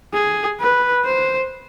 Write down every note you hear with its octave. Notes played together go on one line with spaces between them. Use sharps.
G#4
B4
C5